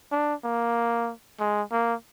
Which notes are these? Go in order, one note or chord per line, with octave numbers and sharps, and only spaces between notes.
D4
A#3
G#3
A#3